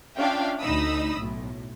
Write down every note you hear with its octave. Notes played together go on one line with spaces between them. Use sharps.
C#4 D4 F4 E5 F5 G5
D2 D#4 B5 D#6 E6
B1 A2